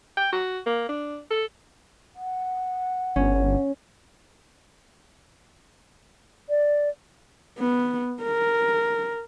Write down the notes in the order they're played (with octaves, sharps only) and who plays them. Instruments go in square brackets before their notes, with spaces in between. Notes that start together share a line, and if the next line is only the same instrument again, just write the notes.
[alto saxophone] G5
F#4
A#3
D4
A4
[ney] F#5
[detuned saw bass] G1 [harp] C#4
[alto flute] D5
[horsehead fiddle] B3
A#4